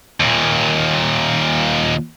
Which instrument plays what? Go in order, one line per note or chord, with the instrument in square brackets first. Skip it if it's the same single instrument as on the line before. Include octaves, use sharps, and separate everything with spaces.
[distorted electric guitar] D#2 A#2